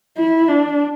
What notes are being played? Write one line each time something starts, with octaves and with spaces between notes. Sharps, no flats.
E4
D4